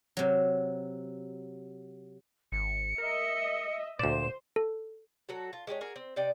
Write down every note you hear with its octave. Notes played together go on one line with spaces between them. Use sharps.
C3 F#3
G#1 C#7
A#4 D#5 E5
D2 A#2 C5 D5 E7
A4
F#3 F#4 A4
F4
G#3 G4 G#4 C#5
F#4 G#4 A#4
C4
C3 D#4 D5 G5